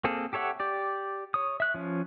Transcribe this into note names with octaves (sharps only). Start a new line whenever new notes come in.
A#3 C4 G#4 A4
G4 A4 C#5 E5 F#5
G4 D5
C#5 D#6
E5 F#6
F3 C#4